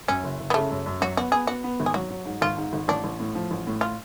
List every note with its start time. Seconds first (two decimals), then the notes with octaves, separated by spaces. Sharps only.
0.08 F#2 C#4
0.23 F#1
0.39 F#1
0.50 B3
0.54 C#3 A3
0.71 F#2
0.86 F#2
1.01 F#3 F#4
1.17 B3 F#4
1.32 B3 G#4
1.47 B3 F#4
1.64 B3
1.80 G#1
1.86 G#4
1.94 F#3 F#4
2.11 F#3
2.25 G#2
2.41 G#1 F4
2.57 G#2
2.73 G#1
2.88 A1 D4
3.04 A1
3.20 A2
3.35 F3
3.51 A1
3.67 A2
3.81 F4